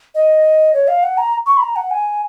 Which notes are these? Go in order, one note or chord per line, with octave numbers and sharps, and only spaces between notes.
D#5
C#5
F5
F#5
A#5
C#6
B5
A#5
F#5
G#5